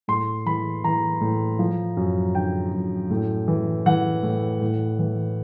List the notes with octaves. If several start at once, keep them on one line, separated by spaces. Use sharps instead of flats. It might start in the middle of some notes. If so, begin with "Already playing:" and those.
A2 C6
E3 B5
E3 A#5
A2
F3
F#2
D3 G5
F#2
A2
E3
E3 F#5
A2
A2
E3